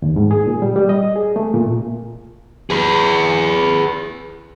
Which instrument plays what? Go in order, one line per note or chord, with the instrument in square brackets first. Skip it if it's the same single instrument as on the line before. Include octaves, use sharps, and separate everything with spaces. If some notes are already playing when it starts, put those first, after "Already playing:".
[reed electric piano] D#2
G#2
G#4
A#2
G3
G3
D#5
G#4
A3
A#2
[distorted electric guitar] G#4 B4